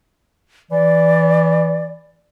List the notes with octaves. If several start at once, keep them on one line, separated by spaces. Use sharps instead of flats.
E3 D5